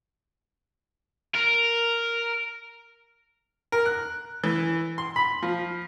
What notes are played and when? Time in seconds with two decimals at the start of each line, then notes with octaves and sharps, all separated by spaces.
1.35 A#4
3.72 A#4
3.86 F#6
4.44 E3
4.98 C6
5.16 B5
5.42 F3